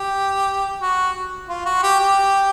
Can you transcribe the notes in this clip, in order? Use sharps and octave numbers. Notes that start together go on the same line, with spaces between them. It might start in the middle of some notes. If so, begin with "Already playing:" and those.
Already playing: G4
F#4
F4
F#4
G4
G4